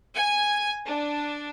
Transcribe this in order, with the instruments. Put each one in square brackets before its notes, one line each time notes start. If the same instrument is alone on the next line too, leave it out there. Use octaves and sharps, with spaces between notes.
[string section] G#5
D4